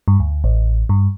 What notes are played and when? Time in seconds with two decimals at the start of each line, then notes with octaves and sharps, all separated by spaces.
0.08 G2
0.20 D2
0.44 A1
0.89 G2